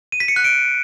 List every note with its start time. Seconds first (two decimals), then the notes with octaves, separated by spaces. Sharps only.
0.12 D#7
0.20 B6
0.28 C#7
0.36 F#6
0.44 D7